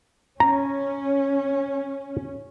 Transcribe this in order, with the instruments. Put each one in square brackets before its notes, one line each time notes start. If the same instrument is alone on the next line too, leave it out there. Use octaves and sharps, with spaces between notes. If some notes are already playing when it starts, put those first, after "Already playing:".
[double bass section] C#4 [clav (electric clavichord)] A#5